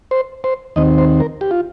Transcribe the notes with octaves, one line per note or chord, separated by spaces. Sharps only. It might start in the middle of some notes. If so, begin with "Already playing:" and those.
C5
C5
D#2 D#3 C4 D#5
C5
A#4
G4
F4